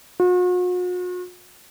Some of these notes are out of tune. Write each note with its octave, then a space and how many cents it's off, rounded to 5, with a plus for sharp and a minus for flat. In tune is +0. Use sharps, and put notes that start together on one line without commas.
F#4 -45